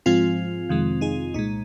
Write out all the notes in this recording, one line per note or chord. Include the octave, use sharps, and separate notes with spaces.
G#2 F3 G#3 C4 F4
F2 C3 D#3 G#3
D#4 G#4
C2 A#2 G#3 D#4